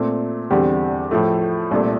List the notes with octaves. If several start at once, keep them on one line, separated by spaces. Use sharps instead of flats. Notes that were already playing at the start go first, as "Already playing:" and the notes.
Already playing: A#2 A3 C4
E2 D3 G3 C4 G4
A2 F3 A3
C2 A#2 A3